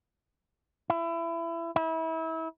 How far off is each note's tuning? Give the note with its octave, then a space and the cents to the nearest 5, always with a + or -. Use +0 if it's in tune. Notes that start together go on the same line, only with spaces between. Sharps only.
E4 +25
E4 -30